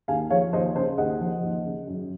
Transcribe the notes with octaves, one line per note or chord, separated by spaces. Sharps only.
D#2 F5 G#5
F3 C#5 F5
D#2 C5 D#5
C#3 G#4 C5
D#2 D#5 F#5
F3
D#2
C#3
F#2